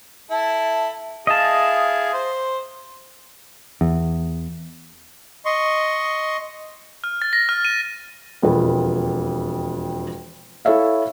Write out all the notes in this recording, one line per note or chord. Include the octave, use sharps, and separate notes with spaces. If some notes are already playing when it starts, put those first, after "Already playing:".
E4 A4
E4 G#4 D#5 F5 A5
C5
E2
D#5 C6 C#6
F6
A6
A#6
F6
D#7
E1 F2 B4
E4 A4 C#5 E5 F5